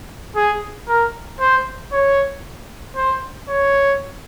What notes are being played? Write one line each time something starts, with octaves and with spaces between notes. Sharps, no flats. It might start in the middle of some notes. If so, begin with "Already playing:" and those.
G#4
A#4
C5
C#5
C5
C#5